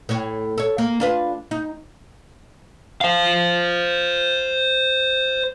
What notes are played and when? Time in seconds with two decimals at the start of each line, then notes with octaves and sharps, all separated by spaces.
0.09 A2 C#5
0.58 A4 C#5
0.78 A#3
1.00 D4 F4 B4
1.51 D#4
3.01 C5 F5